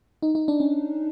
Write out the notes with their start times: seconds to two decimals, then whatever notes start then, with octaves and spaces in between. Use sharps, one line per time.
0.22 D#4
0.35 D#4
0.48 D4
0.60 C#4